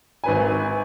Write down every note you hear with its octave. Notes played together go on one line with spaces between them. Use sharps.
G#1 B4 G#5